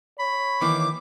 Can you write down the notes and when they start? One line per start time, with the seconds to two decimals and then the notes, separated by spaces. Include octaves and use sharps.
0.19 C#5 B5
0.61 D#3 E3 A#3 D6